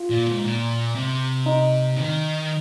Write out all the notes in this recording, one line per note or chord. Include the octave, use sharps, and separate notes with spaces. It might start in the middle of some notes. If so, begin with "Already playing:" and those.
Already playing: F4
A#2
G#2
A#2
C3
D#4
D#3